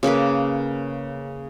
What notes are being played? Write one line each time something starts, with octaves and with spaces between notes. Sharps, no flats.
C#3 A#3 A#4 B4